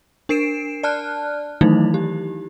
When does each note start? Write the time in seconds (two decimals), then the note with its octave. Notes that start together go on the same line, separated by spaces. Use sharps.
0.29 D4 A#4 C7 D7 E7
0.83 D5 A5 F6 F#6
1.61 D#3 E3 F#3 A3 D#4 E4
1.94 G4